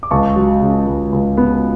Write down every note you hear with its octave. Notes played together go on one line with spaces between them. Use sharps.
D6
C#2 A5 C#6
F#3
C#3
C#2
C#2
B3